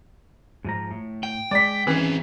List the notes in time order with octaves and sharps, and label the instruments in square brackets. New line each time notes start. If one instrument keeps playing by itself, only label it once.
[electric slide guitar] G#2 F3 A#5
A2
[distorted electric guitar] G5
[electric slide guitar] G#3 [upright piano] D5 B6
[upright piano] E3 [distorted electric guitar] C4 G#4 [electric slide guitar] C#4